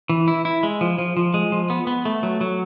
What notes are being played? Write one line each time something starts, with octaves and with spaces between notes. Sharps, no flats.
E3
E4
E4
G#3
F3
F3
F3
G#3
F3
B3
B3
A3
F#3
F#3